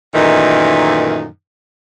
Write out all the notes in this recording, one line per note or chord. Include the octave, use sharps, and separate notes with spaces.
F#2 A#2 D#3 E3 A3 D#4